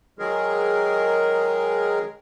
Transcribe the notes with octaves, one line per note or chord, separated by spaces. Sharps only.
D#3 F#3 G#3 G#4 A#4